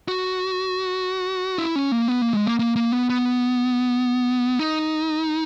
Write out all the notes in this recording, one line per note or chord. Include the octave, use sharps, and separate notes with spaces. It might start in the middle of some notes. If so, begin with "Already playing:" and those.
F#4
E4
C#4
A#3
B3
A#3
G#3
A#3
A#3
A#3
B3
B3
D#4